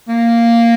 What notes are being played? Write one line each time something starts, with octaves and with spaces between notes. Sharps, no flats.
A#3